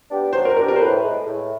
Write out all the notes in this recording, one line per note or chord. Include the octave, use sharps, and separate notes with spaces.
B3 D4 G4
F#3 C5
A#4
B3 D4 G4 A#4
A#4
C5
A2 B4
E3 G#3
A2